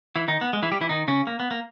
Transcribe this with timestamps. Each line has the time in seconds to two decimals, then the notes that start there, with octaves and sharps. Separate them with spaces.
0.16 E3 E4
0.28 D#3 D#4
0.41 B3
0.53 G#3
0.62 E3 E4
0.72 G3 G4
0.81 E3 E4
0.89 D#3 D#4
1.08 C#3 C#4
1.27 A#3
1.40 B3
1.51 A#3